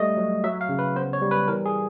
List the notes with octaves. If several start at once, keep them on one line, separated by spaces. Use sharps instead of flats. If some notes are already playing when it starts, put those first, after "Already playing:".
Already playing: G3 A3 D#5
F#3
F#3 E5
F5
C#3
B4
B3 C5
C#5
G3
B4
E3 A#4
G#4